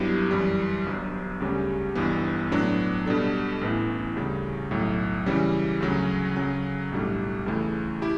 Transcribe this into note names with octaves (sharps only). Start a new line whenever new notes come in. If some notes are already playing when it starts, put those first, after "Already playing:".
Already playing: G2 F#3 B3 E4 G4
F#2 E3 G3
G1 G2 F#3
D2 C#3 G3 C#4 G4
G1 G2 E3 B3
A2 F#3 B3 D4
B2 G3 D4 A4
A1 A2 E3 B3 E4
D2 C#3 G3
B1 A2 F#3
C#3 E3 G3 C#4
D2 C#3 F#3 C#4
C#3 F#3 C#4
B1 A2 G3 D4 F#4
C#2 C#3 E3 A3
E4 G4